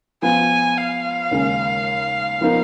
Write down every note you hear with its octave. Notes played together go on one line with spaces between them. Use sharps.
F3 B3 F4 G#5
F5
D#2 C#3 G#3
F3 B3 D#4 A#4